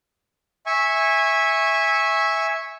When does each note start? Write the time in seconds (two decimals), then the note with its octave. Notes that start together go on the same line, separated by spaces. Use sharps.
0.66 E5 G#5 C#6